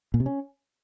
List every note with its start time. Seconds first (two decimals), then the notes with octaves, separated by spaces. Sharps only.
0.14 A#2
0.20 C3
0.26 C#4